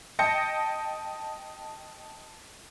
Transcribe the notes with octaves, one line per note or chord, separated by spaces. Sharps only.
D#5 G5 A5 G6 A#6 C#7